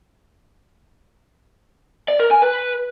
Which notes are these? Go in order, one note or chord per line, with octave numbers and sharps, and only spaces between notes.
D5
A#4
G#5
B4